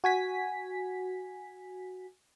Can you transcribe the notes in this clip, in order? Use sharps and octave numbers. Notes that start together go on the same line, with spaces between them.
F#4 G#5 B6